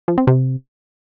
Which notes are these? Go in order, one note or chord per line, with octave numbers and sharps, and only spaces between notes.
F3
C4
C3